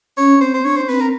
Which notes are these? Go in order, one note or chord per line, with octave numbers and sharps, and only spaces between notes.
C#4 C#5
C4 C5
C5
D4 C#5
C5
C4 B4
A#4